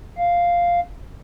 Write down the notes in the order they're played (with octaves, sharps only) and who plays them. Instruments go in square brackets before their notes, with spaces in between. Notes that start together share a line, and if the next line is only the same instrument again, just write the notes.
[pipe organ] F5